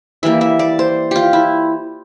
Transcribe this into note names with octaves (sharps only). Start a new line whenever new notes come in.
E3 G3 A#3 E5
E5
D5
C5
F4 G4
E4